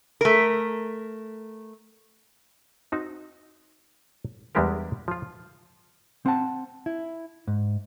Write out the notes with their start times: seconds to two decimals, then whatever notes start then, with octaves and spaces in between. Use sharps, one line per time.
0.21 A3 A#4
2.92 C4 D#4 F#4
4.55 E2 G3 G#3 D4 G4 A#4
5.08 F3 F4
6.26 C4 F#5 A5
6.86 E4
7.47 G#2